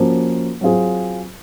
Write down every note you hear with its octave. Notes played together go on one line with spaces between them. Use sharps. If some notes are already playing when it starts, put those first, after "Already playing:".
Already playing: F3 A#3 C#4 F#4
F#3 C4 F4 G#4